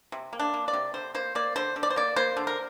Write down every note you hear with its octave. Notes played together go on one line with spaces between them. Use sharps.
C3
A#3
D4
A#3
D5
C3
D3 C5
A#3 C5
A#3 D5
D3 C5
D3
D5
C5
A#3 D5
A#3 C5
D3
A#4